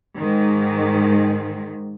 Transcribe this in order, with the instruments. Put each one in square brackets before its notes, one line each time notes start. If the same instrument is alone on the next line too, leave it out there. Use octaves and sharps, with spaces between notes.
[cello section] G#2 D#3